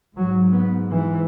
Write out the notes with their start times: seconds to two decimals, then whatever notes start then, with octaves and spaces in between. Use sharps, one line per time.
0.15 G#2 F#3
0.52 B3
0.90 E3